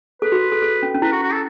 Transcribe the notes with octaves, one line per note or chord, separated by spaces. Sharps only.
A4 B4
F#4
A4
A4
C#4
C#4
E4 B4
F#4
F#4
A4